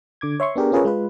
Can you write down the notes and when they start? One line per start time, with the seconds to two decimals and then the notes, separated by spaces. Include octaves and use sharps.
0.21 D3 D6 G#6
0.40 C#5 E5 C6 C#6
0.56 B3 D4 G4 G#4 A#4
0.72 C#4 F4 G#4 A#4 B4 C#5
0.85 G#3 F4 B4